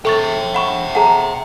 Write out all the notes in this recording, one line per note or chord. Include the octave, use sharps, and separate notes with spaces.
A4 E5 G5 C#6 A6
F#5 B5 C#6
G#4 A4 F#5 A5 A#5